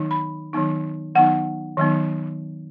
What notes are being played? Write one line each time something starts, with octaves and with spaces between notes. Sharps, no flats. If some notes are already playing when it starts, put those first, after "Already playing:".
Already playing: D#3 F#3 B3 D#4
B5
D#3 F#3 B3 D#4
D#3 F#3 B3 D#4 F#5
D#3 F#3 B3 D#4